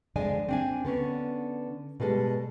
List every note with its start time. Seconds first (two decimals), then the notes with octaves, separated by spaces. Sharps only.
0.16 F2 D3 G#3 D5 D#5 G#5
0.48 C4 D4 G#5
0.85 D3 B3 C#4
2.00 B2 G3 G#3 A4